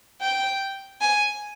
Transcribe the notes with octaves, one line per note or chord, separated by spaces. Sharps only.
G5
G#5